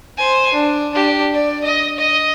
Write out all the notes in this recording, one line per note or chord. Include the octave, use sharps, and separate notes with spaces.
C5 G#5
D4
D4 G4
D5
D#5
D#5